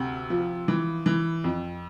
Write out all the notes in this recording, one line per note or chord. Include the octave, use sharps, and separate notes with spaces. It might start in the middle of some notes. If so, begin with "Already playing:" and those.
Already playing: D2 C3
F3
E3
E3
F2